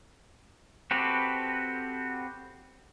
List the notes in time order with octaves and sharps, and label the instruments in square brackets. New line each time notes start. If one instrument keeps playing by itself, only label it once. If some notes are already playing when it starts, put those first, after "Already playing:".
[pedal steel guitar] C4 F#4 G4 A4 B4